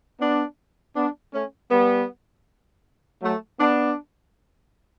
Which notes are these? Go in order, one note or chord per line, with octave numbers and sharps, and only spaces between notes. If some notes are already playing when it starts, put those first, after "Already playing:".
B3 D4
B3 D4
A3 C#4
G3 B3
F#3 A3
B3 D4